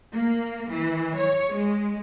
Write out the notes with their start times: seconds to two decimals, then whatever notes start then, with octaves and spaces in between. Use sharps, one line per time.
0.13 A#3
0.71 E3
1.19 C#5
1.54 G#3